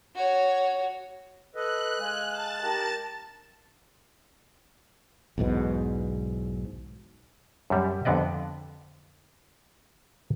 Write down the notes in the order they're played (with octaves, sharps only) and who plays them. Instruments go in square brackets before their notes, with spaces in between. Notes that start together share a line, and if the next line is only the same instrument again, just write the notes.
[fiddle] F#4 C#5
[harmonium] A4 B4 D#5 [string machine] F#6
[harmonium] G#3 [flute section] F5 G#5
[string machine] A5 A6
[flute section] D#4 G4 A#4
[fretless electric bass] B1 E2 G#2 B2
[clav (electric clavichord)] F#2 G3
F2 D3 B3 D5 D#5